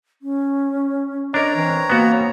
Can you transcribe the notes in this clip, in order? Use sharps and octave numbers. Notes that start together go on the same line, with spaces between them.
C#4
D4 A#4 C#5 D#5 A#5
E3 C4
A#3 B3 F#4